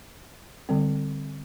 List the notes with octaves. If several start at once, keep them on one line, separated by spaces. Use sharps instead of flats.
D3 G3 C4